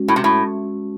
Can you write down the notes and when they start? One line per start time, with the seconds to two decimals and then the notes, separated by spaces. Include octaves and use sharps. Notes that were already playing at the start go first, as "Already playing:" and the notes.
Already playing: G#3 C#4 F#4
0.08 A2
0.16 C3
0.24 A2